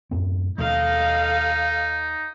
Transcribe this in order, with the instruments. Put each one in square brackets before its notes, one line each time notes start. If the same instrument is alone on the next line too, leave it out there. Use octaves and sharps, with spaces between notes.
[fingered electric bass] F#2 A2 C4
[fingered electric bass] D#2 B2 A3 [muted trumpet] D#4 [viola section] A4 D#5 F5